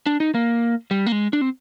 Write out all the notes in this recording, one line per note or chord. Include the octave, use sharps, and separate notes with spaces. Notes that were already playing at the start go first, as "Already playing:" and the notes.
D4
D#4
A#3
G3
A#3
G#3
D4
C4